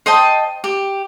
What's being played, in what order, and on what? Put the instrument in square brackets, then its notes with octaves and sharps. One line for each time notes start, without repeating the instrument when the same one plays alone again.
[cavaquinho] C5 D#5 G5 A5
G4